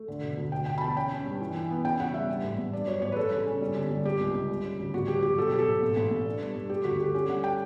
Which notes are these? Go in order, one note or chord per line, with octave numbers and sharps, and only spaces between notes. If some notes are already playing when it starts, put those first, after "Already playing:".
Already playing: A3
D3
E1
D2
B2 G5
B2 G5
B5
E2 A5
C#4 G5
C#4
G2
E3
E3
B3
C#3 G5
E2 F#5
G3 E5
G2
A1
A1
G2 D5
F#3 C#5
A1 C#5
B4
G3 A4
C#3
C#4
G3
G1
G3
G3 G4
C#2
C#2
G3
C#3
D2
A1 F#4
G2 G4
F#3 G4
B2 A4
G4
F#3
A4
B2
A1
A1
A1
D4
G2
G2
A3 G4
D2 F#4
A3 G4
C#4 G4
G3 F#5
G5